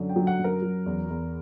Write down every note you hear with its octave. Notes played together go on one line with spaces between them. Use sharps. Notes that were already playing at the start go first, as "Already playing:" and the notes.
Already playing: F#2 D3
G5
F#3
F#5
F#2
A#4
F#3
E2
E2